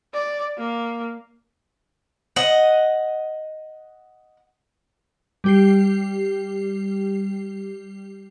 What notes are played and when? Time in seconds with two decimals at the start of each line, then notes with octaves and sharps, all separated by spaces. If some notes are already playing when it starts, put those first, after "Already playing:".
0.13 D5
0.58 A#3
2.36 D#5 F#5
5.44 G3 G4 C7